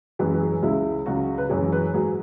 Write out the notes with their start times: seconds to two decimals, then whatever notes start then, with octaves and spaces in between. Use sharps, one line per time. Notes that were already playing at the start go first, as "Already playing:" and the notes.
0.19 F#2 E3 G#3 B4
0.34 B4
0.40 G#4
0.62 C#2 C#3 G#3 E4
1.06 C#2 C#3 F#3 F#4
1.38 B4
1.49 F#2 E3 G#3 C#5
1.72 B4
1.94 G#2 F#3 G#4